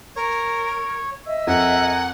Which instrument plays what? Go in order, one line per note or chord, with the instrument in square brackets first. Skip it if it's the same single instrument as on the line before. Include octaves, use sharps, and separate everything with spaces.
[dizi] A#4 [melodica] C#5
[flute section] D#5 E5 E6
[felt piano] F2 [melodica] A#4 G#5 [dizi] F#5